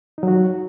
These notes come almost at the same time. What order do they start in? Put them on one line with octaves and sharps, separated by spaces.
D#4 F#3 F#4